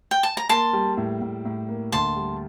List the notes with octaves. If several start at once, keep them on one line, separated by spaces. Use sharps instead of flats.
G5
A5
A#5
A#3 A5 C6
G3
A2
A2
A2
A#3
D2 A5 C6
G3